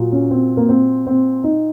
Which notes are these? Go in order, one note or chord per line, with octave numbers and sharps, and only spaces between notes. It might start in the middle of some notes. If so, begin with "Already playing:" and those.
Already playing: A#2 F#3
C#4
C4
A#3
C4
C4
D#4